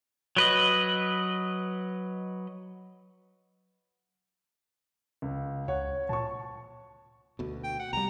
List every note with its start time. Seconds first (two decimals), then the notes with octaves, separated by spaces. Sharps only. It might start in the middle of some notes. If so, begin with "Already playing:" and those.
0.37 F#3 B4 D#5
5.22 C#2
5.68 C#2 C#5 F#5
6.09 A#2 A5 C#6
7.39 D2 B2
7.64 G5
7.79 F#5
7.93 C2 G3 A#5